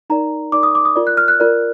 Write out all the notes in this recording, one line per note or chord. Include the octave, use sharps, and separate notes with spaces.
D#4 A#4 D5 A#5
D#4 A#4 D5 D6
D#6
D6
D#6
F4 A#4 D5
F#6
F6
F#6
F4 A#4 D5